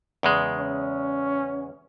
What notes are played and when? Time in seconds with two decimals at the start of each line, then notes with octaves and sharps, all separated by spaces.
0.23 E2 C#3 G#3
0.58 C#4